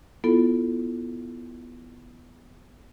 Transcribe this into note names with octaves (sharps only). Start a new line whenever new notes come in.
B3 E4 F4 A4